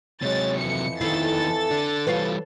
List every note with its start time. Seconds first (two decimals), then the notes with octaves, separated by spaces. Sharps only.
0.22 C3 F#3 G#3 C#5 A6
0.59 F2 E3 C#7
1.01 E2 D#3 E4 A4 F5 A6
1.71 D3 D4
2.07 E3 G3 F4 B4 C#5 F5